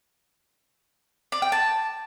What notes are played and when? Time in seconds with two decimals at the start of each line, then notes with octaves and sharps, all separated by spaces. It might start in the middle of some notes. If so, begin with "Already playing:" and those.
1.32 D5
1.42 G5
1.52 A5